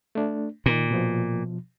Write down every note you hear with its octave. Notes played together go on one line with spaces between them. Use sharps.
A3 D4
A#2 D#3
B2 F3